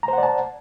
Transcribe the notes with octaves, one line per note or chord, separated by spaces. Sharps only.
C5 D5 F#5 A5 A#5